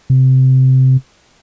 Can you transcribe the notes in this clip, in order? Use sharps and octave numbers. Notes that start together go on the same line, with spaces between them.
C3